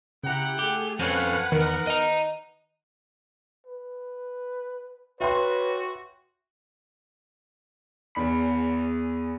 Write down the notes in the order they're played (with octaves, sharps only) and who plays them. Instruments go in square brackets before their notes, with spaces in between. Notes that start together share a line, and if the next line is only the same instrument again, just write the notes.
[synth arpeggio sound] C#3 A#5 [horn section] E4 F#5 G5 [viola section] G4
[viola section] A3 G#4 [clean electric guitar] G4
[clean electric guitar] F2 C4 C#4 [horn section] A4 C#5 F5 [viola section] B4 F#5
[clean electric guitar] E2 [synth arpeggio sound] D#3 [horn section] B3 A#4
[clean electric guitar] D#5 A#5
[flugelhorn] B4
[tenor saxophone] F#4 [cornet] B4 [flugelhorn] C#5 [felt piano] E5 G5 C6
[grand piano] E2 [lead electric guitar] G#4 B5